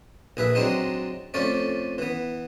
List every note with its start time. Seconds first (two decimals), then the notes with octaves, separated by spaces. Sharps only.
0.37 A#1 G#4 B4 E5
0.55 F#3 G#3 C4 D4 D#4
1.34 F2 F3 A3 C#4 D5
1.98 E3 B3